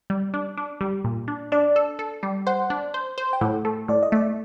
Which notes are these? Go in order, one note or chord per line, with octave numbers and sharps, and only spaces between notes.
G3
D4
D4
G3
A#2
D4
D4 D5
A4
A4
G3
C5 F#5
D4
C5
C5
G5
A2 F#5
A3
A2 D5
D#5
A3 D5